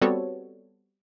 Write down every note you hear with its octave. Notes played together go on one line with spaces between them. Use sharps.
G3 B3 C4 F#4 A4 C#5